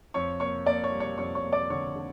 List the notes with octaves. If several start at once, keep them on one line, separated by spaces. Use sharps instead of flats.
F2 C#5 C#6
A#3 C#5 C#6
A#3 D5 D6
C#5 C#6
G3
C#5 C#6
F2 C#5 C#6
C#5 C#6
A#3
D5 D6
D3 C#5 C#6
D3